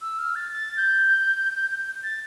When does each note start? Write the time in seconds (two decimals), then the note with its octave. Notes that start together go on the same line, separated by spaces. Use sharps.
0.01 E6
0.18 F6
0.36 A6
0.52 A6
0.77 G6
2.03 A6